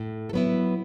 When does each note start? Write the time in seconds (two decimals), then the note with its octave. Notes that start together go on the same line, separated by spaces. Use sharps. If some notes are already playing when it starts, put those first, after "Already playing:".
Already playing: A2
0.29 A4
0.33 F#3 B3 E4 B4